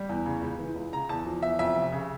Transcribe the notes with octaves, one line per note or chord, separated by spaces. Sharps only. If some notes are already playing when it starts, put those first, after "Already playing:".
Already playing: G3
E2
C#3
C#2
E3
C#2
C#3 A#5
E2 A5
F3
E2 E5
F2 E5
F1
C#3